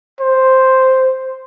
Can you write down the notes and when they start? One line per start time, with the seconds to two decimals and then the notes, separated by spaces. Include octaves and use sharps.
0.20 C5